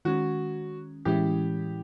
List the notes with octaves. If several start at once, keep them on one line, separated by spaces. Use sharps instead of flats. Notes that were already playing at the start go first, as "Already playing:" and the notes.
D#3 G#3 C#4 F#4
A2 E3 G#3 C#4 E4 G4